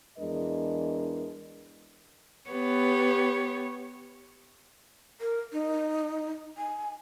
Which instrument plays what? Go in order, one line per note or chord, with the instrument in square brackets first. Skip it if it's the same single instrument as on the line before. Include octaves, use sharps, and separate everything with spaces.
[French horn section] E2 G#3 D4 A#4 D#5
[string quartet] B3 G4 B4 C#5
[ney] A#4
D#4
G#5